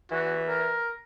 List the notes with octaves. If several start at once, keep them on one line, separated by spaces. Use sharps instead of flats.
E3 F#4
A#4